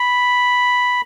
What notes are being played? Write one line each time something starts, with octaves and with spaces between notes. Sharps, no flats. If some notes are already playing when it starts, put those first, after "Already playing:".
Already playing: B5